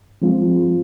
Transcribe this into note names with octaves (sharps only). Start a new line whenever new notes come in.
F3 G#3 C4 F4